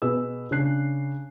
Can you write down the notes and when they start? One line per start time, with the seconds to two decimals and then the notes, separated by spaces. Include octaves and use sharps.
0.02 B2 G#4 B4 E6
0.51 C#3 D4 F#6 C7